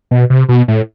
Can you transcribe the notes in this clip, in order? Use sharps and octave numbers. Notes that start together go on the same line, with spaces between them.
B2
C3
B2
A2